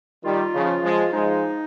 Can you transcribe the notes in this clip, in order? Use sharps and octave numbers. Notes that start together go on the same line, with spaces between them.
D#3 G3 F4
C#3 F3
F3 G#3
F3 G#3 D#4